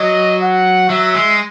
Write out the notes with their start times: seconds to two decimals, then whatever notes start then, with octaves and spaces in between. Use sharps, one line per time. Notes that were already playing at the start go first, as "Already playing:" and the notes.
Already playing: F#3 D#5
0.42 F#5
0.90 F#3 E5
1.15 G#3